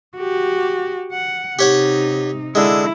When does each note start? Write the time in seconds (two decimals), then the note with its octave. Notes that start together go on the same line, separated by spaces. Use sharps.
0.17 F#4 G4
1.12 F#5
1.59 C3 D#4 G4 C#5 F#5
2.55 D3 G#3 E4